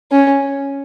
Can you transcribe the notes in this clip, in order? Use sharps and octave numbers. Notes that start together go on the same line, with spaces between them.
C#4